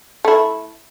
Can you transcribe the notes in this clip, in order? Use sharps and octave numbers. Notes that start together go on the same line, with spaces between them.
A3 E4